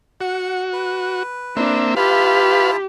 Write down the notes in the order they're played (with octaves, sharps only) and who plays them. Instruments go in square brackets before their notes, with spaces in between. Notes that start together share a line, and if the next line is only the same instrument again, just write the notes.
[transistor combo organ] F#4 [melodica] F#5
[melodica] B4
[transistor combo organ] A#3 C4 E5 [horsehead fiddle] D4
[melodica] E4 F4 A5 [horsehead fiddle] G4 [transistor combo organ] B4 F5